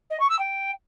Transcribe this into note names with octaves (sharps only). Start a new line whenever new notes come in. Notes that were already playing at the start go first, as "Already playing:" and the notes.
D#5
C#6
E6
G5